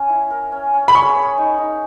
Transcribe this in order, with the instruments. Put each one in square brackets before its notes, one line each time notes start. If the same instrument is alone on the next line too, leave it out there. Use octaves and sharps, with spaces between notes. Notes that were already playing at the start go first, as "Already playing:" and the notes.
Already playing: [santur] C#4
E4
A#4
C#4
C#4
[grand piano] B5
[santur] G#4 [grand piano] C#6
[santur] C#5
D#4
D#4